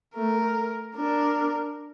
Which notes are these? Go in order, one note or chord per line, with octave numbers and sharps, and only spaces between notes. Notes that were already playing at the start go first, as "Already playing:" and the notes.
A3 A#4
D4 A#4